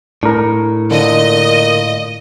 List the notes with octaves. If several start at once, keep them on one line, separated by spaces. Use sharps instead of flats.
A2 D4 A#4
A#2 D3 D#5